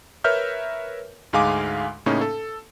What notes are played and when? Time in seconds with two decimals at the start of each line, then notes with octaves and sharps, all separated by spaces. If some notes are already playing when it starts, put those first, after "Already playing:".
0.24 A#4 B4 C#5 E5 F6 G6
1.33 D2 G#2 G#3 F5 G#5 D6
2.06 A2 C#3 A#3 C#4 D#4
2.21 A4